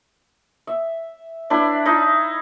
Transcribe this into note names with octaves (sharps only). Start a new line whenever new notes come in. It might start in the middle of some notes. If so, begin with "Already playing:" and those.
E5
D4 E4 B4
D#4 E4 D#5